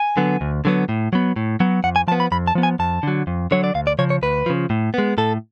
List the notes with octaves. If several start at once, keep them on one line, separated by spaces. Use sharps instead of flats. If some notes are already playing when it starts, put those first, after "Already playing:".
Already playing: G#5
D3 F#3 B3
D2
D3 F#3 B3
A2
F#3 B3
A2
F#3 B3
F2 F#5
G#5
F3 B3 A5
B5
F2 B5
A5
F3 B3
G#5
F2 A5
D3 F#3
F2
D3 F#3 C#5
D5
D2 F5
D5
C#3 F3 C#5
C#5
D2 B4
C#3 F3
A2
G#3 B3
A2 A4